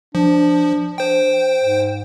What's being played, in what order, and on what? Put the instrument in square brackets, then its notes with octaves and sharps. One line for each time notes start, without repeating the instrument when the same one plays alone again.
[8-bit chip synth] F3 [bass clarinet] D4
[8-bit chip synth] C5 G5
[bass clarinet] G#2